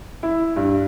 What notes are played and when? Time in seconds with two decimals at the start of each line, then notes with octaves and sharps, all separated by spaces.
0.23 E4
0.56 G2